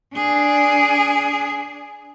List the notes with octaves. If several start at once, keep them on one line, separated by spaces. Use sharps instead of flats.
D4 G#4